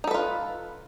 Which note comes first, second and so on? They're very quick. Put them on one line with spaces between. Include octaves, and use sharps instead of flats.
D#4 A4 B4 F4